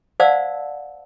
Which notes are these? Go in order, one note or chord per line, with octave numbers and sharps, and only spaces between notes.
C5 D5 F5 F#5 A5 E6